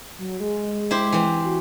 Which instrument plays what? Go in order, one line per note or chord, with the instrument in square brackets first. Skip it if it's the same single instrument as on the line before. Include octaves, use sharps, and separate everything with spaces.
[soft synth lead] F#3
G#3
[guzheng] E4 G4 C5
E3 C4
[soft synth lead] F#4